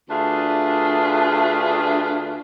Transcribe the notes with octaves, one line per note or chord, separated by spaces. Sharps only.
D2 D4 F4 G#4 B4 E5